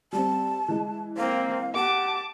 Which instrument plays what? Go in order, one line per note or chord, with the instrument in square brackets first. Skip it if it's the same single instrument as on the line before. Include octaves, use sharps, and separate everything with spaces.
[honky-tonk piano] G3 C4 [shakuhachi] A5
[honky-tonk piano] E3 G#3
[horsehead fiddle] A#3 C4 [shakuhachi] F5
[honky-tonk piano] B3 [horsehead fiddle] G4 [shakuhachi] F#5 [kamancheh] A5 D6